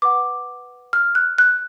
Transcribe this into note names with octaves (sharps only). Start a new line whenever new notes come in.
B4 F#5 D6
F6
F#6
F#6